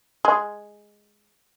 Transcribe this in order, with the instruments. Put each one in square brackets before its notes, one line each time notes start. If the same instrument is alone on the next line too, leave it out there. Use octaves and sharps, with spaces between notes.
[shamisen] G#3